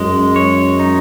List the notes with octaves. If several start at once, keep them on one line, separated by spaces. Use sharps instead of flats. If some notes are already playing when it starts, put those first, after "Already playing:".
Already playing: F#2 G#3
C#5
D#4